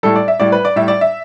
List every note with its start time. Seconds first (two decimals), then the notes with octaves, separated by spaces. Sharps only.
0.03 A2 G3 A4
0.16 D5
0.28 E5
0.40 A2 G3 D5
0.52 B4
0.65 D5
0.76 A2 G3 E5
0.88 D5
1.01 E5